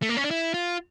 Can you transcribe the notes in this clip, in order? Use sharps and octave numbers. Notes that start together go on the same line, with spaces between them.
A3
A#3
C#4
D4
E4
F4